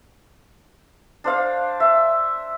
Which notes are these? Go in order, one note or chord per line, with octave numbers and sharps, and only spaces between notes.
D4 C5 F5
E5